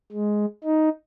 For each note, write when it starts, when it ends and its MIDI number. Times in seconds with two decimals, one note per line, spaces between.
0.12 0.45 56
0.64 0.89 63